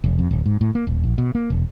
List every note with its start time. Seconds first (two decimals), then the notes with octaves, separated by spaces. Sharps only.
0.04 E1
0.19 F2
0.31 D1
0.46 G#2
0.61 A2
0.75 A#3
0.87 D#1
1.04 A#1
1.18 B2
1.35 A#3
1.50 E1